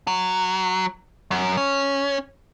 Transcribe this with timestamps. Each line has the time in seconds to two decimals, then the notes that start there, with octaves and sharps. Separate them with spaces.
0.08 F#3
1.31 F#2
1.57 C#4